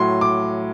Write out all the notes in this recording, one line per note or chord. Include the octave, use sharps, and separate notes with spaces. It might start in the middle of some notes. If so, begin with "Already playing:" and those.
Already playing: A2 F#3 C6
D6